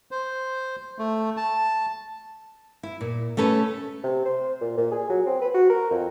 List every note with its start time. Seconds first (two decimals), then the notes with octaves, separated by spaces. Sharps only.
0.11 C5
0.99 A3
1.37 A5
2.83 E4
3.01 A#2
3.37 A3 C#4 A4 B4
4.04 C3
4.25 C5
4.61 A#2
4.77 A#2
4.91 G#4
5.09 F#3
5.26 C4
5.41 B4
5.54 F#4
5.70 A#4
5.91 F2